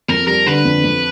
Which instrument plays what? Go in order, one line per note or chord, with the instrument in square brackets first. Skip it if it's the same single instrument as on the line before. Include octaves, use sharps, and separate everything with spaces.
[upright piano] F2 [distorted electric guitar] A#4
[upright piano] G3 [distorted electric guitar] A#4
[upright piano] D3 [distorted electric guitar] B4
[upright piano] F2
F2